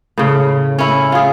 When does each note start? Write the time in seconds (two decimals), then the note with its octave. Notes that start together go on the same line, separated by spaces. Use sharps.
0.18 A2 C#3
0.79 C#4 E4
1.12 F4 G#4